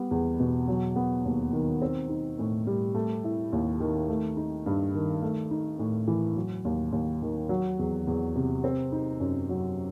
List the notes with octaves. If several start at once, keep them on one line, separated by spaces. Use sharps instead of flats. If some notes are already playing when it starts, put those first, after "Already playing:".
Already playing: G3 B3
E2
B2
F#3
B3
D#2
D#3
C4
D#4
A2
G3
A3
E4
D#2
D#3
A3
D#4
G2
D#3
A3
D#4
A2
E3
F#3
D#2
D#2
D#3
F#3
E2
E2
C3
C4
D#4
F#2
F#3